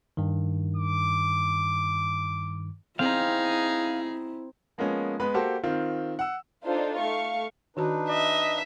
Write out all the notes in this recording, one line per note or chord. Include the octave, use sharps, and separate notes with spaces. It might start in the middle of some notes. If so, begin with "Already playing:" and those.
G2 D#3
D6
C4 D#4 E4 G#4 F5
F3 G#3 A#3 B3 C#4
G#3 B3 B4 B5
A#3 F#4 G4 A4 C5
D#3 C4 F4
F#5 E6
D4 D#4 F4 A4 C5
A3 F5 C#6
D#3 D4 D#4 F#4 B4 A5
D#5 E5